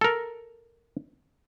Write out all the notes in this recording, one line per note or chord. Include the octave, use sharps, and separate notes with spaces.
A4 A#4